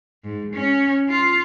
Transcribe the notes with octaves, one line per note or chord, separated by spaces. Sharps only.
G#2
C#4
F4